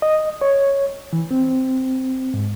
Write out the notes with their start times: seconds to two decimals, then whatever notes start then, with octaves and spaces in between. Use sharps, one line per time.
0.02 D#5
0.41 C#5
1.13 E3
1.31 C4
2.34 G#2